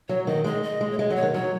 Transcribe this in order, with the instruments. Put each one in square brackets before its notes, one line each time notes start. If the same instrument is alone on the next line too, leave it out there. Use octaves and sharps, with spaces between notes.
[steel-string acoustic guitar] F#3 [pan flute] C#5
[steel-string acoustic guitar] D#3 [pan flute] D#5
[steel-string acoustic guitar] G#3 [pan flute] D#5
[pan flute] D#5
[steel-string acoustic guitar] G#3
[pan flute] C#5
[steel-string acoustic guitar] G#3 [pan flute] D#5
[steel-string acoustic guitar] F#3 [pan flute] D#5
[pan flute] C#5
[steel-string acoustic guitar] D#3
[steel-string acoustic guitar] F#3 [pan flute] C#5